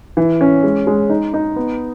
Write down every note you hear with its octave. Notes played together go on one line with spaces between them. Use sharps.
E3
C#4
G#3
G#3
D#4
D#4
B3